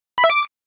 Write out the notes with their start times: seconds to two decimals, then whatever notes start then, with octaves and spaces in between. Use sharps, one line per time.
0.18 B5
0.24 E5
0.30 D6